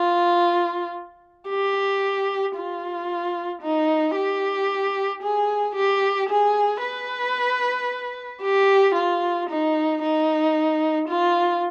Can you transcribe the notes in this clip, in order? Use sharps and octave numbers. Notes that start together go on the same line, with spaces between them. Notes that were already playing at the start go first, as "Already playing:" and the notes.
Already playing: F4
G4
F4
D#4
G4
G#4
G4
G#4
B4
G4
F4
D#4
D#4
F4